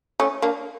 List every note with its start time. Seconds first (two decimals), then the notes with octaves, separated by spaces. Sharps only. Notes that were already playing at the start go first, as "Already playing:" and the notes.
0.20 A3 C#4
0.42 A#3 D4